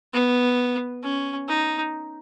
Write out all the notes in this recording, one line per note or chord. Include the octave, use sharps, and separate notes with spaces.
B3
C#4
D#4